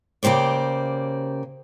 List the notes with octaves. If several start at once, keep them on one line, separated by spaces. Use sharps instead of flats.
C#3 A#3 G4 C5 D5